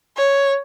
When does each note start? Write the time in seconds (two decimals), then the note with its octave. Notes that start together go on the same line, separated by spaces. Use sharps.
0.17 C#5